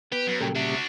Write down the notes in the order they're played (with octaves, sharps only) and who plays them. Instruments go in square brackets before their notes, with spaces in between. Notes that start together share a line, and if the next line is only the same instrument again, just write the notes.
[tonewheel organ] B3 [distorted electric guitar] G4 [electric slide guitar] B4
[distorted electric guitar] F#2
[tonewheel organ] A#2 C#3 G3 [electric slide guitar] A4 A#4 G5
[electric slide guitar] C3 E5 [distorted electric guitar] D4 F#4